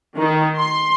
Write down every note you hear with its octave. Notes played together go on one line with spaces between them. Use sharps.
D#3
C6